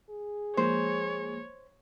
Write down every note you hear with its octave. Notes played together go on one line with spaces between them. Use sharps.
G#4
F3 G#3 A#3 C5 C#5